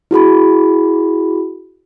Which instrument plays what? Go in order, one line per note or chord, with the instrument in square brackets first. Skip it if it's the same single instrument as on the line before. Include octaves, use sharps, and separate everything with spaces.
[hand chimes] E4 F#4 G#4 B5